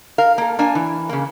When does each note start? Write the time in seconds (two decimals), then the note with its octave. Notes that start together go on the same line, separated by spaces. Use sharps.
0.18 A#4 F5
0.38 A#3 A4
0.59 A#3 D4 G#5
0.75 E3
1.09 C#3 A#3